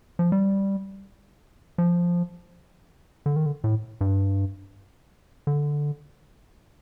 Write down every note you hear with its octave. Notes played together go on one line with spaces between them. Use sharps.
F3
G3
F3
D3
D#3
D3
A2
G2
D3